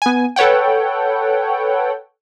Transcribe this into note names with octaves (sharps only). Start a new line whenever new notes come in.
B3 G#5
A4 B4 C#5 F#5 G5